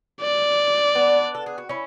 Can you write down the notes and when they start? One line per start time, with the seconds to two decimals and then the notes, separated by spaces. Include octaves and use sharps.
0.21 D5
0.95 B3 D4
1.35 A4
1.46 G#4
1.58 F#4
1.69 C#4 E4